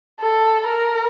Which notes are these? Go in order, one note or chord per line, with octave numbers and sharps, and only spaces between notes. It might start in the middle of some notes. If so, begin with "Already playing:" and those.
A4
A#4